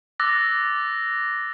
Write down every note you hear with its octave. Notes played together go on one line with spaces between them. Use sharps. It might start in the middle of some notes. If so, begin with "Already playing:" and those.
D6 E6 F#6 A6 A#6